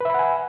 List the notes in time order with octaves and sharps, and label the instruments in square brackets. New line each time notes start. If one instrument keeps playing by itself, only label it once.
[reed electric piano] B4
E5
B5
F#5
G#5